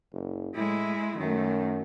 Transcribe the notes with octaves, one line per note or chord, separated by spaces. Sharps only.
F#1
A2 G#3 E4
F#2 D#3 A3